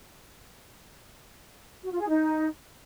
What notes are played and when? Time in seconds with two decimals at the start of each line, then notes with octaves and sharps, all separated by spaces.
1.84 F#4
1.92 F4
2.00 G#4
2.09 D#4